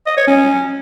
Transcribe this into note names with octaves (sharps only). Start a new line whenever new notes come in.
D#5
C#5
C#4